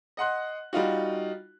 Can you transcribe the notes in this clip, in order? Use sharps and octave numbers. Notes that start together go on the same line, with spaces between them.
D#5 F#5 C6 F#6
G3 D#4 F4 F#4